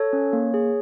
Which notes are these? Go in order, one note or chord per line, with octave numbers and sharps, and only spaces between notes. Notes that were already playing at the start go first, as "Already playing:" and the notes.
Already playing: A4 C#5
C#4
A#3
G#4